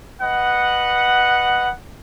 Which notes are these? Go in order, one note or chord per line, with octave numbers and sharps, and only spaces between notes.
B4 D#5 F#5